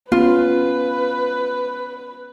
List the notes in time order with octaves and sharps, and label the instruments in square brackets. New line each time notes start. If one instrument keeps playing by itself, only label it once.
[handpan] B3 C#4 [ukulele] F4 [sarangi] B4